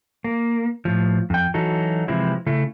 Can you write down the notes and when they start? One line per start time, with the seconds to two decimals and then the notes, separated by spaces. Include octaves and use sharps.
0.24 A#3
0.85 A2 F3
1.30 F2 G5
1.54 E3 F#3 D#4 F#4 A4
2.08 C3 E3 F3 G#3 C4 E4
2.46 C#3 A3 E4